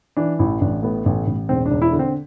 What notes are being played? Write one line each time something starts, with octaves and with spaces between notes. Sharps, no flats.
E3 D4
A1 E4
A1 D4
A2 B3
A1
A1
E1 C4
D4
E1
E4
D3
C4